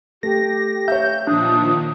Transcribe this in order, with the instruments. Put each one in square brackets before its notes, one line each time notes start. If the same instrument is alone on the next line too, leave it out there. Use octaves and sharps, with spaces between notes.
[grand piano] A3 [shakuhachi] G4 [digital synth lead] A#6
[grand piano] C#5 E5 [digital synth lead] G6
[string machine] A#2 D#3 F3 [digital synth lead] D4 [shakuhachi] D#6